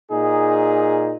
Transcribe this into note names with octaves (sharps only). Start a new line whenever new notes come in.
A#2 D#4 G#4